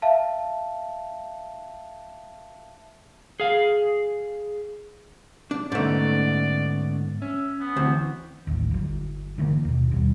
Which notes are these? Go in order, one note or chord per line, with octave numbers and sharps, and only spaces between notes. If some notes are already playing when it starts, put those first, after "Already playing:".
E5 F5 A5
G#4 F5
D4
D2 G#2 A3 B3 C#4 D5
C#4 E5
B3
D2 E3 C4
D1 A1 D#2
G1 F#3
D3 E3 G3 A#3
D#2 B2
G#1 D#2 B2 G3